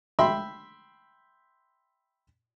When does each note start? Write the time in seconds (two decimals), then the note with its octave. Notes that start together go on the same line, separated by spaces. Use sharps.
0.19 E5 G5 B5 C6